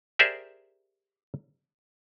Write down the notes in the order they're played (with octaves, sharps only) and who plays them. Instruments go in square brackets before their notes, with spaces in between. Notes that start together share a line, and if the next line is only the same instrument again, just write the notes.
[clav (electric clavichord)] G4 G#4 A#4 C5 D5 E5